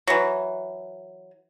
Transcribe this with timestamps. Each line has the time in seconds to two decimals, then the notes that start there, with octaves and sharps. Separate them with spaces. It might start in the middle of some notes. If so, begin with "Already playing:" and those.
0.07 E3 F#3